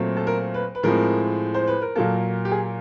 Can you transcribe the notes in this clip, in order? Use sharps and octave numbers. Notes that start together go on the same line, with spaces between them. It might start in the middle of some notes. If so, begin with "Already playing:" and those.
Already playing: A#2 F#3 A3 C4
A4
A#4
B4
B4
A2 F3 G#3 C4 A#4
C5
B4
A#4
A#2 F#3 A#3 A4
G4
G#4